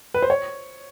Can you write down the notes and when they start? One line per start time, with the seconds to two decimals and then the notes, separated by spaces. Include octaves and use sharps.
0.14 B4
0.22 C5
0.30 C#5